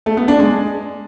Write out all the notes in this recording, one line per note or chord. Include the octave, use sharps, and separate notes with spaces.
A3
B3
D4
G#3